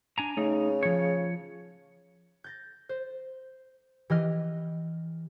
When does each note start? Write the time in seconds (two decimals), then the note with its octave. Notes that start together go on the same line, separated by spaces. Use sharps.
0.18 D4 G#5 A#5
0.37 C#3 A3 D#4
0.83 F3 C#5
2.44 G6 A6 A#6
2.89 C5
4.10 E3 G4 D#5 F6